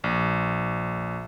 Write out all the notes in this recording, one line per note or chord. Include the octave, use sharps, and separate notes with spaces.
A#1